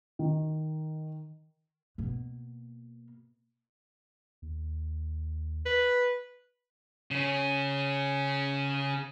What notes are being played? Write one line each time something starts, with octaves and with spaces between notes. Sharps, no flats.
D#3
B2 A#3
D#2
B4
C#3 C#4